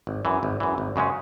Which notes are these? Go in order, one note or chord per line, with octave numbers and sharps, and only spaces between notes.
G#1
F#2 E3
G#1
F#2 E3
G#1
F#2 C#3 G#3 C#4